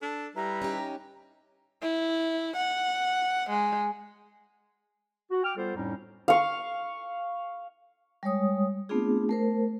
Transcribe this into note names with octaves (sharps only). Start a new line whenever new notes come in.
D4 A4
G3 E4 B4 A#5
C#4 D#4 G4
E4
F#5
G#3
F#4
G5 D6 F6
G3 B3 F4 A4 C5
F2 A2 G3 C#4 D#4
F5 C#6
G3 G#3 C#5 D#6
A3 B3 C4 D4 F4 G#4
A3 A#4 C5